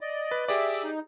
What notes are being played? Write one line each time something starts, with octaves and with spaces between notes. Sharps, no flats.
D5 D#5
B4
G4 G#4 D5 E5 D6
D#4